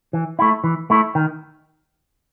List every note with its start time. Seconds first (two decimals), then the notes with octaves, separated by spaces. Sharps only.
0.13 E3
0.39 A3 E4
0.64 E3
0.90 A3 E4
1.15 D#3